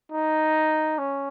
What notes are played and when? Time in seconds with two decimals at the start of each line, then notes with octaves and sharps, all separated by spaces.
0.12 D#4
0.99 C#4